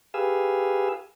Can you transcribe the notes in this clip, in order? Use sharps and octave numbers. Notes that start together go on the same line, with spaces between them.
G4 G#4 B4 F5 G#5 E6